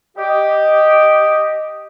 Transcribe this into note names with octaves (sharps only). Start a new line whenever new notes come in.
G4 D#5